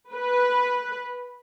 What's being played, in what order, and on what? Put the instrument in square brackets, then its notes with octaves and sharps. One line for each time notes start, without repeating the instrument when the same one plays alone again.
[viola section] B4